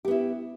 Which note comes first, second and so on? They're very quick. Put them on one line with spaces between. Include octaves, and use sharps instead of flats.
G4 B3 E4